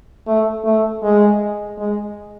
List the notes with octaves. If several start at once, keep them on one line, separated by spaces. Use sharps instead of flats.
A3
A3
G#3
G#3